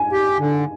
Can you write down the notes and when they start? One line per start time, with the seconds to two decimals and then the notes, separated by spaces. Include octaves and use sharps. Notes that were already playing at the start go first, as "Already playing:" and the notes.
Already playing: G#5
0.12 G4
0.39 D3